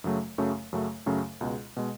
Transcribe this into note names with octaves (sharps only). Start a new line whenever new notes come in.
F#2 C#3 F#3 A3
F#2 C#3 F#3 A3
F#2 C#3 F#3 A3
F#2 C#3 F#3 A3
C#2 B2 G#3
B2 G#3